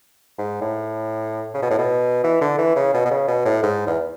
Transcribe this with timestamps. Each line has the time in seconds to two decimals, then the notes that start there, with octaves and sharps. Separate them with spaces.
0.38 G#2
0.61 A2
1.54 C#3
1.62 B2
1.70 A2
1.78 B2
2.24 E3
2.41 D3
2.58 E3
2.75 C#3
2.94 B2
3.05 B2
3.11 C#3
3.28 B2
3.45 A2
3.63 G#2
3.87 E2